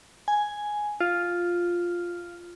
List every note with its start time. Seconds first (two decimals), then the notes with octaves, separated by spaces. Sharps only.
0.28 G#5
1.00 F4